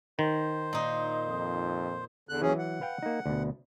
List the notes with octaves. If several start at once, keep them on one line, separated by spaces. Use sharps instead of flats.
D#3 C5
A#2 D#4
F2
E2 D3 F#6
D#2 E3 F#3 C#4 G#4
F#5
B4 F5 G5
A#3 D#4
D2 B2